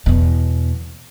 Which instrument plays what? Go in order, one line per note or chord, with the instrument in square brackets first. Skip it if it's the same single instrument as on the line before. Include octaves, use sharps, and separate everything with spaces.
[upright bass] E2 B2